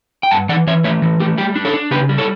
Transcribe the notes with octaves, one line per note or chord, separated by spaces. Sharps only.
G5
G2 F#5 A5
E3 D5 F#5
E3 C#5 E5
A3 C#5 E5
E3
A3 G4
G3 G4
D4
A4 C#5
D4
C#3 G4 B4
G3
A4 C#5